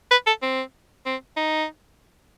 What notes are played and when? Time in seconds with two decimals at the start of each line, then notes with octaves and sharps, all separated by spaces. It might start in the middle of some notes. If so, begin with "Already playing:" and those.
0.11 B4
0.27 A4
0.42 C4
1.06 C4
1.37 D#4